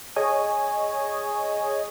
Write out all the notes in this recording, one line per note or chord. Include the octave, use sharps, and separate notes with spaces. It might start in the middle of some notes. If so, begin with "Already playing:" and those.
G#4 C#5 D#5 G#5